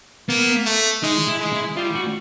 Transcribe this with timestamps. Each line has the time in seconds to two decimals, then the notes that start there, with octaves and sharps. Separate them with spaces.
0.28 A#3 B3
0.65 A3
1.03 G#3 D#4
1.27 E4
1.40 G#3
1.52 E4
1.77 G3 F4
1.95 F#4